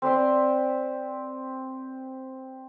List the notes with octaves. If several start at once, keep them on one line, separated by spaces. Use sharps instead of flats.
C4 B4 D5 C6